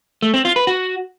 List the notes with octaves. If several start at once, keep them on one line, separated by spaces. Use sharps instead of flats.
A3
C4
F4
B4
F#4